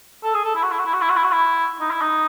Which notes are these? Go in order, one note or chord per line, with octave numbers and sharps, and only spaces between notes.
A4
G#4
A4
E4
F#4
E4
F#4
E4
F#4
E4
F#4
E4
F#4
E4
D#4
E4
D#4